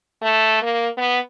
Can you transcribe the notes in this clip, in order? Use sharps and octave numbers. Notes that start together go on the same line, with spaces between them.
A3
A#3
B3